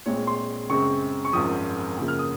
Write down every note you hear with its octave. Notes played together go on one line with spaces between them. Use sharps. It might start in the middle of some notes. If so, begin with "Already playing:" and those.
A#1 A#2 G#3 C4 C#5
C6
F#2 C#3 G#3 C4 C#6
C#6
G#1 F#2 F3 D#6
F#2 C#3 F3 A#3
F6
D#6